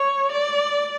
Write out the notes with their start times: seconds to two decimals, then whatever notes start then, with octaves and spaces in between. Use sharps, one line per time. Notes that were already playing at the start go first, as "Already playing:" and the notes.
Already playing: C#5
0.32 D5